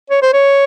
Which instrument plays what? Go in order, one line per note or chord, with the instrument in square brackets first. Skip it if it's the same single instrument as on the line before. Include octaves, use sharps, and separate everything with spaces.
[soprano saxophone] C#5
C5
C#5